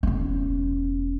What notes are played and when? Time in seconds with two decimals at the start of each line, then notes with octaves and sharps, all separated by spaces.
0.03 E1 C#4